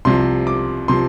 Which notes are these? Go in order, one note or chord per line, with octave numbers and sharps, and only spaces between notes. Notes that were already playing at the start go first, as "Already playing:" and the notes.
C2 C3 F3 C6
D6
C3 F3 C6